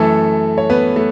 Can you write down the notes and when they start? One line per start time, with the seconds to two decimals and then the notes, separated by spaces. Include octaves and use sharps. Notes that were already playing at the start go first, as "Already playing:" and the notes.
Already playing: F#2 E3 A3 A4
0.58 C#5
0.70 B3 B4
0.96 A3